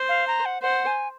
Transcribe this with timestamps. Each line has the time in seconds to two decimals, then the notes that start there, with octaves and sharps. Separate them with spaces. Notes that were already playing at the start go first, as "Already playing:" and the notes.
Already playing: C5
0.09 F5
0.27 A#5
0.45 F#5
0.62 C5 F#5
0.86 G#5